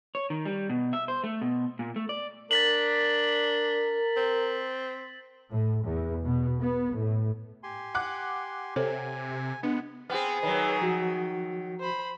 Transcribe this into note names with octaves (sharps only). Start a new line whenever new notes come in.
C#5
D#3
G3
B2
E5
C5
A3
B2
A#2
A3
D5
D4 A#4 A6 B6 F#7
C4
A2
E2
B2
B3
A2
G4 G#5 C6
F#5 D6 F#6
C3 A4 C5 C#5 G#5
G#3 B3 D4 F#5
B3 C4 G#4 F6
D#3 F#3 B4 C#5
F3 F#4
C5 B5